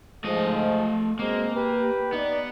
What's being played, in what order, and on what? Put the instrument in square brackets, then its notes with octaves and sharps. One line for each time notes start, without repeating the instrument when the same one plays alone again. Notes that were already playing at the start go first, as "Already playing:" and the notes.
[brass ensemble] G#2 F3 G#3 [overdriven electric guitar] A3 D#5
[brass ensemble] B2 G#3 C4 [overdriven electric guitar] A#3
[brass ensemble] G4 B4 G5
[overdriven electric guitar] B3 [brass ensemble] D#4 D5